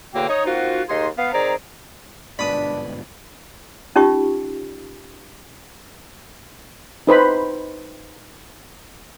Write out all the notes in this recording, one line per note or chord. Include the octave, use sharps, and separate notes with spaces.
E2 A2 D3 A#3 F#4 G5
D#4 C#5 D#6
A#3 C4 D#4 F4 F#4
D#2 D#4 G#4 C6
B3 F5
D#3 C4 G#4 D5 A#5
G1 G#2 B2 D4 B4 D5 B5 D#6
C#4 D#4 F4 G4 C#6
D#4 B4 C5 B5